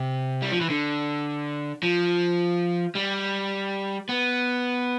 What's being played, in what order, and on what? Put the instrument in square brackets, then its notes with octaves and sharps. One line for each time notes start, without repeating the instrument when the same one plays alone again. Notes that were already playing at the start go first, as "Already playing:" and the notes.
Already playing: [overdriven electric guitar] C3
G3
F3
E3
D3
F3
G3
B3